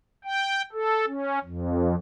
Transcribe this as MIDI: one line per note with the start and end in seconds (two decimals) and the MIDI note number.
0.25 0.62 79
0.73 1.05 69
1.07 1.39 61
1.44 1.95 41